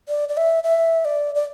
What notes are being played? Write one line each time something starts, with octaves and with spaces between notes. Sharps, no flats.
D5
D5
E5
E5
D5
D5